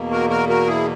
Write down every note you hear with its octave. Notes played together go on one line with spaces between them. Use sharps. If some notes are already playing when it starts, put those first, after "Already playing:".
Already playing: E2 B2 A#3
F#4 A#4
F#4 A#4
F#4 A#4
E4 G#4